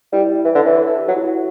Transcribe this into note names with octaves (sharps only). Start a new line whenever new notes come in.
G3 E4
E3 E4
D3 A4
E3 C#5
B4
A4
G4
F#3 F#4
E4
F#4